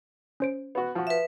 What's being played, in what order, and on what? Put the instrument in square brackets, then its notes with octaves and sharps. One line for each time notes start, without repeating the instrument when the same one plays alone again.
[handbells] C#4 C5 D7
[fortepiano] B3 F#4
F3 F#4
[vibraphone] B4 E5